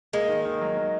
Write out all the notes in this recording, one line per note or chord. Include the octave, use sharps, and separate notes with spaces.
G#3 A#3
D#3
D#3
F#3
A#3